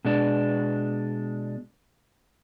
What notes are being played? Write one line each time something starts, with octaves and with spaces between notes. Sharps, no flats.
B2 G#3 D4